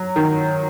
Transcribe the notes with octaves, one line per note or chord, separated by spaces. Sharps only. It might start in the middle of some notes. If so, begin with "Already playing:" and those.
Already playing: F#3
D#3